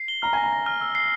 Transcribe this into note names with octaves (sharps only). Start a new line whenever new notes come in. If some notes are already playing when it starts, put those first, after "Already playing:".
Already playing: C7
G7
A#5 F6
G#5 A#6
A#5
A#6
F6
E6
C7